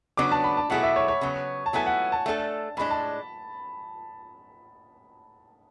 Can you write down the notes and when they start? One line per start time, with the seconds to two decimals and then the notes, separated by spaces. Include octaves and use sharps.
0.17 C#3 F#3 B3 D4 D6
0.32 A5
0.44 B5
0.57 A5
0.70 B2 F#3 A3 E4 G#4 F#5
0.83 E5
0.96 C#5
1.08 C#5
1.21 C#3 F#3 B3
1.66 A5
1.73 F#3 B3 E4 A4 G#5
1.86 F#5
2.12 A5
2.26 A3 D4 A4
2.77 A2 G#3 D4 B5
2.90 A5